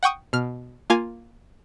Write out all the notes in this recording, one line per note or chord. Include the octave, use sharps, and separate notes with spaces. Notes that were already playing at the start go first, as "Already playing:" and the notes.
F#5 G5 C#6 D#6
B2 F6
A#3 F4 F5 G#5